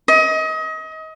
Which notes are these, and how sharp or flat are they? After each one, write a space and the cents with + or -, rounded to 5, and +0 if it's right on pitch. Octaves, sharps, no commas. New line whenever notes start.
D#5 +30